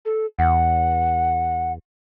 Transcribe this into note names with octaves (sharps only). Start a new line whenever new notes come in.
A4
E2 F#5